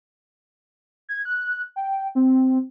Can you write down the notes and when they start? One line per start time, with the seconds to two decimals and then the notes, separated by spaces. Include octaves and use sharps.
1.09 G#6
1.25 F#6
1.76 G5
2.15 C4